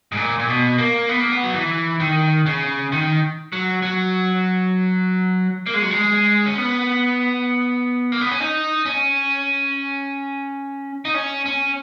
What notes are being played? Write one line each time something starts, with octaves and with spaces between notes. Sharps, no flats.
G#2
A#2
A#2
B2
A#3
B3
A#3
B3
F#3
E3
D#3
C#3
D#3
F#3
F#3
A#3
G#3
F#3
G#3
C#4
B3
A#3
B3
C#4
D#4
C#4
D#4
C#4
C#4